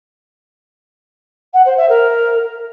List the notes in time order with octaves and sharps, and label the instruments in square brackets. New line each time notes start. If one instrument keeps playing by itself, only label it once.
[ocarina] F#5
C5
E5
A#4